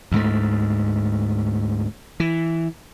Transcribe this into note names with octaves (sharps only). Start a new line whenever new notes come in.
D2 G#2 A3
E3